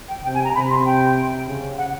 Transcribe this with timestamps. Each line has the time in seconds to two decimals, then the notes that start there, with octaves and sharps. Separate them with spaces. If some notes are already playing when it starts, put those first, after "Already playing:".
0.09 G5
0.24 C3 G5
0.34 G#5
0.44 A#5
0.55 C3 B5
0.70 C6
0.85 G5
1.47 C#3
1.78 F#5